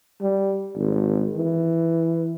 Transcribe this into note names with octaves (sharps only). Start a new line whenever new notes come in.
G3
G#1
E3